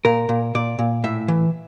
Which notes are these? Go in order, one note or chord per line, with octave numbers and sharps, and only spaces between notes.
A#2 A#4
A#2
A#2 D5
A#2
A2 E5
E3